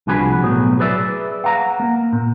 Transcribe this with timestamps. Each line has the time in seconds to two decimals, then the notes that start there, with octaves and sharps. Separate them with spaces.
0.07 C2 F3 D4 F#4 G#4 B4
0.42 B1 A2 F#3 B3
0.79 G#4 B4 D5 E5
1.44 F5 F#5 A#5
1.80 A#3
2.13 A#2